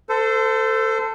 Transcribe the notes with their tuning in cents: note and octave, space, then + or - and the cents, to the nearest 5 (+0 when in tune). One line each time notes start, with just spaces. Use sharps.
A4 +20 C5 -25